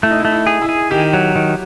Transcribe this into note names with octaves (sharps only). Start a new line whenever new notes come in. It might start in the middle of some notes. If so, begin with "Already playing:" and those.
A3 E4
D#4
E4
A3
E4
G#4
E4
G#4
D#3 G4
F#3
D#3